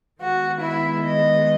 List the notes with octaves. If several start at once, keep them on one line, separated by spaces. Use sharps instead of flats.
D#3 G#3 B3 F#4
E4
D#5